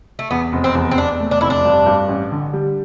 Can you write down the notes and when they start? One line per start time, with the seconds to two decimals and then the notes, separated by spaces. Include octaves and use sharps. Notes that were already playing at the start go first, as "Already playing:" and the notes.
0.19 A3
0.31 E2 B3
0.53 F1
0.64 C4
0.75 E2
0.91 C4
0.98 E2 D4
1.20 A3
1.31 D4
1.41 F1 E4
1.50 D4
1.65 G2
1.86 G2
2.08 A1
2.32 D3
2.53 G3